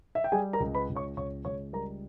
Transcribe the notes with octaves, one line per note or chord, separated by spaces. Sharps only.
E5
G5
G3 G#4 G#5
A#4 A#5
C#2
B4 B5
C#2
C#5 C#6
C#2 C#5 C#6
C#2 C#5 C#6
G3 A#4 A#5